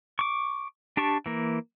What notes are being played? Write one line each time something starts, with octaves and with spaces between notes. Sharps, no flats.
C#6 D6
D4 G4 A5 C#6
E3 A#3